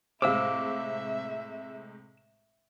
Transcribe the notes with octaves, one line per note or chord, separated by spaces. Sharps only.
A2 C3 G#3 C5 E5 F5 D6 E6